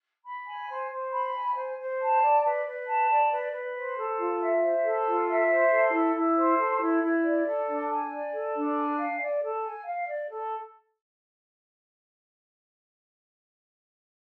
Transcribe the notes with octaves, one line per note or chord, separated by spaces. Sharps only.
B5
G#5
C5
C5
B5
G#5
C5
C5
A5
D5
B4
B4
A5
D5
B4
B4
C5
A4
F4
E5
C5
A4
F4
E5
C5
A4
E4
E4
C5
A4
E4
E4
D5
A4
D4
G#5
D5
A4
D4
G#5
F5
D5
A4
G#5
F5
D5
A4